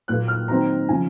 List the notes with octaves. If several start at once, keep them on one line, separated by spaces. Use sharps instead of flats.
A#2 F#3 A#3 F#6
F6
D#3 F#3 C4 A#5
C#3 F3 G#5